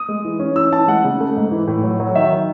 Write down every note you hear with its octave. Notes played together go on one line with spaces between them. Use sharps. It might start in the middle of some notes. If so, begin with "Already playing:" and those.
Already playing: D#6
G#3
E3
C#4
E3 E6
E3 A5
G#3 F#5
C#3
A3
G#2
E3
A2
F#3
F#3
D#3 E5
D#3